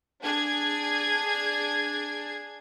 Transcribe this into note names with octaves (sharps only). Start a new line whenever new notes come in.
D4 G#4 G#6